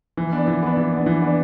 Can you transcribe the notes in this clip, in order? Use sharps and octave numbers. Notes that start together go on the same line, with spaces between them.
E3
B3 D4
E3
B3 D4
E3
B3 D4
E3
B3 D4